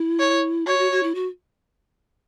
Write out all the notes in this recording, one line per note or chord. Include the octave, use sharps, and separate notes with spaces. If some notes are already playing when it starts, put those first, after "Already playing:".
Already playing: E4
C#5
F#4 C#5
F#4
F#4
E4
F#4